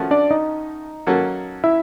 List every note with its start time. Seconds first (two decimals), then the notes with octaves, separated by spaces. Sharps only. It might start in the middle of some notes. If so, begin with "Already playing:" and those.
Already playing: F3 A3 C#4 F#4
0.11 D4 D5
0.31 D#4 D#5
1.07 F#3 A#3 C#4 F#4 A4
1.64 E4 E5